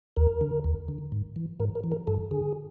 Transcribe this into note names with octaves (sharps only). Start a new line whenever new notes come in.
D#2 A#4
D3
D#2
D3
G#2
E3
G#2 A#4
A#4
E3
A#4
G2 A4
D3 G#4